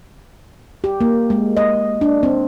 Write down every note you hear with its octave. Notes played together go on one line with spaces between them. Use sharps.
G4
A#3
G#3
D#5
D4
C4